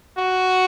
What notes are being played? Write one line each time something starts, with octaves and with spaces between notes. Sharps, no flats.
F#4